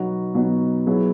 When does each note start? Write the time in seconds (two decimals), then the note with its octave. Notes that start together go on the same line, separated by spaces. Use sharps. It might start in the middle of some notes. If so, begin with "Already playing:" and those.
Already playing: B2 F#3 B3 D#4 F#4
0.34 B2 F#3 B3 D#4 F#4
0.86 F#3 B3 E4 G#4